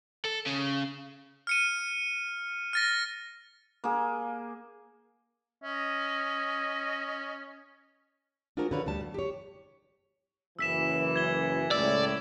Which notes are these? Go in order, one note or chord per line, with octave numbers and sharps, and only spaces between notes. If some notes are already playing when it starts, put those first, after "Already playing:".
A4
C#3
F6 C#7 D#7
F6 A6 A#6
A#3 G#4
C#4 D#5
D4 F4 F#4 G#4 A#4 C5
D3 F3 A#4 B4 C#5 F5
D2 G3 A5
F#3
G4 C#5
F#1 F#2 E3 E6 B6 E7
G#6 G7
C#2 A2 D5 E6